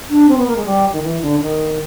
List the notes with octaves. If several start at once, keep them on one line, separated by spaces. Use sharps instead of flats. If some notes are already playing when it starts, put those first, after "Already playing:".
D4
C4
B3
A#3
G#3
G3
D#3
E3
D3
D#3